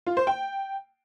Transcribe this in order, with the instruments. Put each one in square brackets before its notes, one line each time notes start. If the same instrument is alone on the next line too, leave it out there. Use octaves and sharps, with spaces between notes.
[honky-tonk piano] F4
C5
G5